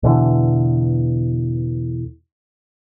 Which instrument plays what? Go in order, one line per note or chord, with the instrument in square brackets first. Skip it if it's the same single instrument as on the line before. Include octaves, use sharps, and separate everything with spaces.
[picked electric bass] E2 B2 D3 E3